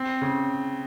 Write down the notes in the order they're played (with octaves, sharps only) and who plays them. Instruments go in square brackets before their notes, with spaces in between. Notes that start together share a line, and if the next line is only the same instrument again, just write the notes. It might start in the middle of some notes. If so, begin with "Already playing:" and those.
Already playing: [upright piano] C4
C#3